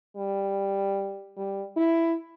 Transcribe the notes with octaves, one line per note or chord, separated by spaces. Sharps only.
G3
G3
E4